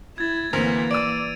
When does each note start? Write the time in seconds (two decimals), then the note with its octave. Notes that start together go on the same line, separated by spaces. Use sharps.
0.18 E4 G#6 A6
0.53 D2 E3 A#3 C4 A#4 F7
0.91 D5 E6 D7 D#7